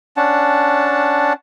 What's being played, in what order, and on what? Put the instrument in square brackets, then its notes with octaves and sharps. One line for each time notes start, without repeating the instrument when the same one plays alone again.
[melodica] C#4 D4 F#5 A5